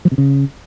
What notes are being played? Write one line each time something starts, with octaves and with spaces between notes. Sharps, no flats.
F3
C3
C#3